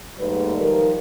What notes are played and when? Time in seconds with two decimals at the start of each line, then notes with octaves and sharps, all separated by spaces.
0.18 D#2 G#2 G3 A3 B4
0.59 D#3 F3 G3 A#4